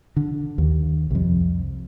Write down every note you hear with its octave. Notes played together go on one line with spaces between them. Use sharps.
D3
D#2
C2 F2